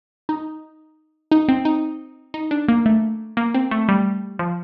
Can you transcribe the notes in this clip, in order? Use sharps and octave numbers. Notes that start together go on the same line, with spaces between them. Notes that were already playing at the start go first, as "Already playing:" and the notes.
D#4
D#4
C4
D#4
D#4
D4
A#3
A3
A#3
C4
A3
G3
F3